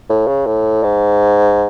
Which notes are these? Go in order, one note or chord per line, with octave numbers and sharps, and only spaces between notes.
A2
C#3
A2
G#2